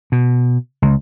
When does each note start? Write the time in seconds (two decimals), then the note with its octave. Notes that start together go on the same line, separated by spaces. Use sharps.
0.12 B2
0.82 C#2